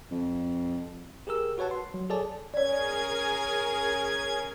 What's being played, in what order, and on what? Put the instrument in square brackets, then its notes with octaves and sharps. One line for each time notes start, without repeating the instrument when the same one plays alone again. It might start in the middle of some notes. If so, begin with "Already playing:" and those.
[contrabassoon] F2
[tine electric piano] G4 G#4 A#4 E6
F#4 B4 C#5 F#5 A5
C6
F#3
G#4 A4 C#5 D5 G#5 A5
[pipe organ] C#4 G#6 [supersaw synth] G#4 A#4 G#5 [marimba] C#5 D5